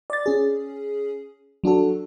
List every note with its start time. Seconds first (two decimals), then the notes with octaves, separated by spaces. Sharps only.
0.10 D5 A6
0.26 C#4 G#4
1.64 F#3 D4 F#4 A4